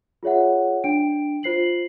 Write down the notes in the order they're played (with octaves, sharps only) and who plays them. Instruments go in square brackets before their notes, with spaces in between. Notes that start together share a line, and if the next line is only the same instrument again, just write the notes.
[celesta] F4 G#4 C#5 E5 F#5
D4 G5 D7
F4 C5 C7 F#7